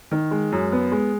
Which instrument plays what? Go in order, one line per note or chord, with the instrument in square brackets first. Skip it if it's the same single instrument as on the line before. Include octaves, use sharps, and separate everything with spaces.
[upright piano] D#3
G#3
F#2
B3
G#3